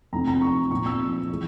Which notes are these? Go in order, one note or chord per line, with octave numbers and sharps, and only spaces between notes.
F2 C3 F3 C4 A#5
A#5
C#6
A#2 F3 C4 C#6
E6
E3 G#3